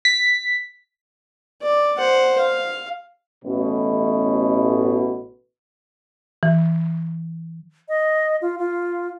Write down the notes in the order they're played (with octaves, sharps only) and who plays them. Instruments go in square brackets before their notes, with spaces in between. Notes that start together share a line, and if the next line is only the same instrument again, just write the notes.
[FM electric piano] B6
[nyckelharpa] D5
C5 F#5
F5
[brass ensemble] A1 B2
[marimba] E3
[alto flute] D#5
F4
F4